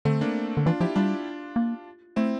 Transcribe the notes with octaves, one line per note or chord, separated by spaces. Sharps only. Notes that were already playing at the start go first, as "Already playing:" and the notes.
D3 A3 C4
A#3 D4
D3
E3 D4 F4
F3 E4 G4
G3 D4 F4
A#3
A3 C4 E4